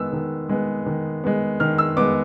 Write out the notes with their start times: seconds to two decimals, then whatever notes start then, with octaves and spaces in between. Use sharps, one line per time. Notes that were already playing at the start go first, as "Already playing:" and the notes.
Already playing: D#3 G#3 B3 E6
0.13 D#3
0.49 G#3 B3
0.86 D#3
1.24 G#3 B3
1.60 D#3 F6
1.78 E6
1.97 G#3 B3 D6